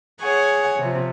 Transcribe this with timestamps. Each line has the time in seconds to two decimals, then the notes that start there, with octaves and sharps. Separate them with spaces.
0.22 G#4 C#5 F#5 G#5
0.79 C3 F3